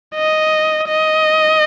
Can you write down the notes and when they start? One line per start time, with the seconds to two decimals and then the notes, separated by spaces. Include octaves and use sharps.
0.15 D#5
0.88 D#5